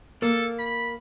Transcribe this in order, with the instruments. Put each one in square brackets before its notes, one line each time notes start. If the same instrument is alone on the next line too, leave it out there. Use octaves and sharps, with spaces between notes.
[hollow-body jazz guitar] A#3 [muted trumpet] A4
[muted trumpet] B5